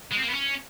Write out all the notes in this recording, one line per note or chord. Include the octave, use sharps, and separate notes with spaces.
G#3
C4
A#3
B3
C#4